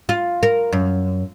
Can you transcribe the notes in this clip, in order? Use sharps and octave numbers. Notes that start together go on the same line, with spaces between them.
F4
A#4
F#2